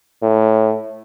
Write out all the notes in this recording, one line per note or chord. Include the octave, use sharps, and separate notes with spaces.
A2